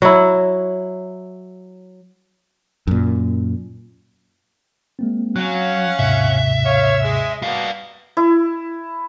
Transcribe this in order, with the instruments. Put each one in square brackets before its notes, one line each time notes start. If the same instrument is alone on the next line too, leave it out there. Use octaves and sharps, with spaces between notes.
[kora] F#3 E4
[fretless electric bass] F#2 A#2
[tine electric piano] G#3 A#3 C4
[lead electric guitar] F#3 [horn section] C#4 F5 F#5 [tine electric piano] F#6
[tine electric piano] D#2 G#2 C3 [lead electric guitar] E5
[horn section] C#5 F5
G#3
[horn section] B2 A#3 [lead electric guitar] G3 F5
[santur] E4